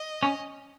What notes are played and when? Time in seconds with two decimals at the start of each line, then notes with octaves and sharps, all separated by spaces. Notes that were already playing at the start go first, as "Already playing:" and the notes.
Already playing: D#5
0.23 C#4